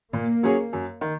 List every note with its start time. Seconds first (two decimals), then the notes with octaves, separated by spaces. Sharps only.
0.13 A#2 A#3
0.43 F#3 C#4 G#4 C#5
0.73 F#2
1.01 D#3